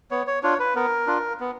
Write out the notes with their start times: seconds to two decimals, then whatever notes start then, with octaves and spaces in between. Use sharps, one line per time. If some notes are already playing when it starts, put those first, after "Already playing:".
0.11 B3 C#5
0.27 C#5
0.43 D4 F4 C#5
0.59 B4
0.75 B3 A#4
1.07 D4 F4
1.40 B3